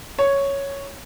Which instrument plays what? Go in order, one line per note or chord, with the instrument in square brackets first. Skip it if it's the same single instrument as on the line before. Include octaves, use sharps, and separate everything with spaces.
[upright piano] C#5